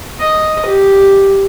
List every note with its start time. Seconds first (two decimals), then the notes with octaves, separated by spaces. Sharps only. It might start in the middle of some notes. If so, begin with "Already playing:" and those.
0.19 D#5
0.65 G4